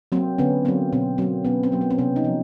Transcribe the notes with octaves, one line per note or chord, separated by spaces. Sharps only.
F#3 A#3 C4
D3 B3 C#4
F#3 A#3 C4
B2 C4
F#3 A#3 C4
B2 B3 C#4
C4
F#3 A#3
B3
C4
C3 B3 C#4
C#4 D#4
F3